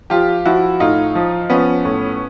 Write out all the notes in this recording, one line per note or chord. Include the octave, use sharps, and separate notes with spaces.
F3 F4 G4
F3 E4 F#4
A2 D#4 F4
F3
F3 B3 C#4
A2